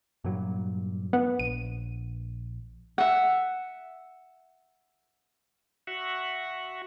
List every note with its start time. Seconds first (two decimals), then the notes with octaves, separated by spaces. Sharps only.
0.24 G2 A#2 F#3
1.13 B3
1.40 A#1 D#7
2.98 E5 F#5
5.87 F#4 E5 F#5